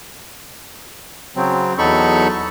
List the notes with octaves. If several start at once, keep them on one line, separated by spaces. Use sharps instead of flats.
C#3 F#3 C4
E2 F#3 D#4 A4 B5 C#6